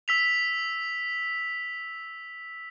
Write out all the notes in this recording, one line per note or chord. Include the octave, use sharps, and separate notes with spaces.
E6 B6 F7